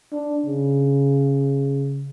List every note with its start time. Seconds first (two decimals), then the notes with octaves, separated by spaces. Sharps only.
0.12 D4
0.46 C#3